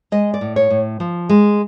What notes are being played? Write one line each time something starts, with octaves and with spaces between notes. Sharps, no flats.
G#3 D#5
D5
A2
C#5
A2
F3
G#3